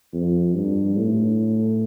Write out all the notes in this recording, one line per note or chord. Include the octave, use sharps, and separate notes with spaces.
F2
G2
A2